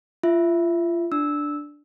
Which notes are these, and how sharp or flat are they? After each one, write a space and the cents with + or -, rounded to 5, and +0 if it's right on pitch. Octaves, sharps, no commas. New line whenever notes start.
F4 -30 E5 +0
D4 +0 E6 -15